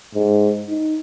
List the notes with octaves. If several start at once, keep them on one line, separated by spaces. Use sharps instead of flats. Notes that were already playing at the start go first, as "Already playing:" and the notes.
G#2
D#4